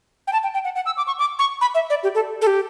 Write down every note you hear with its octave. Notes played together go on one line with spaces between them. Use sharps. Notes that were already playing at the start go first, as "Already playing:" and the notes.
G5
A5
G5
G5
F#5
F#5
E6
D6
C#6
D6
C#6
B5
E5
D5
G4
A4
A4
G4